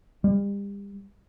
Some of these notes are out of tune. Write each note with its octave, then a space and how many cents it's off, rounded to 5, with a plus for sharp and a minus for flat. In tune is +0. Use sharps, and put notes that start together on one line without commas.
G3 +35